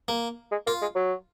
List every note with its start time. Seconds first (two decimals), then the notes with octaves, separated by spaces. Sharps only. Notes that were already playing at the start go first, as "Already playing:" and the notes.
0.08 A#3
0.51 G#3
0.67 A#3 F4
0.82 G#3
0.96 F#3